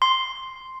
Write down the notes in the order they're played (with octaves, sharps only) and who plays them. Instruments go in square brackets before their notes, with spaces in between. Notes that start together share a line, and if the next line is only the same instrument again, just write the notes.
[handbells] C6